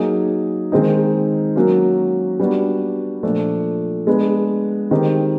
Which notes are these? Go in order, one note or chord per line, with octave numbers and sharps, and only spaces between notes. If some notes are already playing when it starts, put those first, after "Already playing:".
Already playing: F#3 A#3 D#4 G#4
D#3 G#3 C4 D#4
F#3 A#3 C#4 F#4 A#4
G3 B3 D4 F#4
A#2 F3 A3 D4
G#3 B3 D4
D#3 G#3 C4 D#4 G4